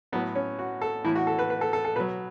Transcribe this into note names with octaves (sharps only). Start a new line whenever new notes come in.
A2 F#3 B3
C#4
F#4
A4
A2 E3 E4
F#4
A4
B4
B4
A4
A4
A4
B2 F#3 B4